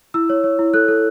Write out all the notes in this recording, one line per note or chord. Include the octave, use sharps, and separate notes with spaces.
E4 E6
C#5
C#5
E4
A4 F#6
A4